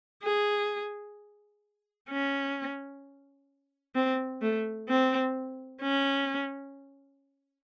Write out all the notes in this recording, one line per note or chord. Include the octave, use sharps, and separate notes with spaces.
G#4
C#4
C4
A3
C4
C#4